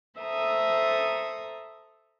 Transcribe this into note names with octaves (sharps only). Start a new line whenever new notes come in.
A4 C5 E5 A#5 D#6